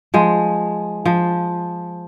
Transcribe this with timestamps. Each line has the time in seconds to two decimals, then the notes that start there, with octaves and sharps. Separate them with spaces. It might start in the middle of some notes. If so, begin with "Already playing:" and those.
0.14 F3 G#3
1.05 F3